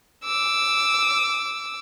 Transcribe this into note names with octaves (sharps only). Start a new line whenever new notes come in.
D6 E6